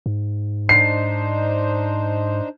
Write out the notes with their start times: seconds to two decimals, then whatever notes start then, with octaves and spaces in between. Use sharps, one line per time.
0.06 G#2
0.69 D4 D#4 C5 C7